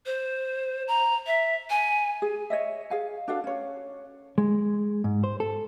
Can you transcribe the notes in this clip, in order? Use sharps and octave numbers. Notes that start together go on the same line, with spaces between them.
C5
A#5
E5
G#5
G#4
C#5 D#5 E5
G#4 F5 G#5
D4 F#4 A4 F5
C#4 C#5
G#3
G#2
C5
A4